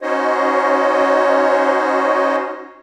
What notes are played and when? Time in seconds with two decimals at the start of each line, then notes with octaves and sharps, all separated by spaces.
0.01 C#4 D#4 F#4 C5 C#5 D#5